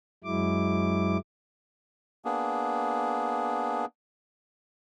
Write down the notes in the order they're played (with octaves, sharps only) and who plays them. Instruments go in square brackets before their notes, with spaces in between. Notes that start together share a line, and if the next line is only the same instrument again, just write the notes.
[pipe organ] F#2 F#3 G#3 E4 D6
[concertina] A#3 B3 D4 G#4